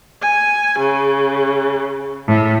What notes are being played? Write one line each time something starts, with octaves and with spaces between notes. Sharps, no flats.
G#5
C#3
A2